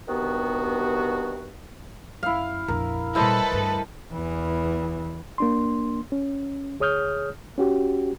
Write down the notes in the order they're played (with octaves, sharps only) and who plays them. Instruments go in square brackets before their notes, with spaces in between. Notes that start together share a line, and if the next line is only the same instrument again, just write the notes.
[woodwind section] G2 C3 D#3 B3 F#4
[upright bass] F#2 [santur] E4 F5
[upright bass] A#1 F2 [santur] A#4
[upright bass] A#2 G3 [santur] E4 C5 D#5 [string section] A4 B4
[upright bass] D2 G2
[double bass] E2 E3
[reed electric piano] A#3 D4 C6
C#4
D2 G#4 C#5 D#6 F6 G6
C#4 F#4 G4